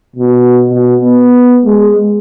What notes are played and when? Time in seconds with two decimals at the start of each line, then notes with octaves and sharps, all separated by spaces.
0.16 B2
0.70 B2
1.01 B3
1.65 G#3